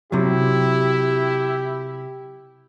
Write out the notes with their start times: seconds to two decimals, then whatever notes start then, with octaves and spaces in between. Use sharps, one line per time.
0.12 C3 F#3 E4 G4